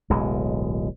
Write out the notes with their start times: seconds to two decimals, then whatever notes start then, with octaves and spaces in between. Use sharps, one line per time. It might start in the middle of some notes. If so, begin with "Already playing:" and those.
0.10 D1 B1 G#3